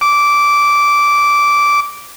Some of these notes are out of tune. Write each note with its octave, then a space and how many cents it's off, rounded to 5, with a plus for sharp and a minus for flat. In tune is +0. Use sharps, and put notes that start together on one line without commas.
D6 -10